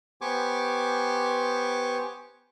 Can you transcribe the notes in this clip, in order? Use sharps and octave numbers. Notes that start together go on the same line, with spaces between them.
B3 G4 C5 G#5 C#6 D6